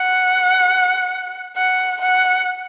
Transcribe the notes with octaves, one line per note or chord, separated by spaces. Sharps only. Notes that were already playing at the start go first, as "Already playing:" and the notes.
Already playing: F#5
F#5
F#5